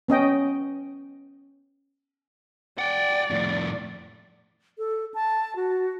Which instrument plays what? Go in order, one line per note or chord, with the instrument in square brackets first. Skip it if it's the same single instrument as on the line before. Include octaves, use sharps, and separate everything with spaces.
[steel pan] B3 C#4 D#5 G5
[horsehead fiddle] D5 [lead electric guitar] F#5 G5
[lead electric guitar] F2 A2
[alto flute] A4
A5
F#4